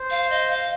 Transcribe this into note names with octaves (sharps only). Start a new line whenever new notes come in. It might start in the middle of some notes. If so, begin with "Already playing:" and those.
Already playing: C5
F5
D#5
F5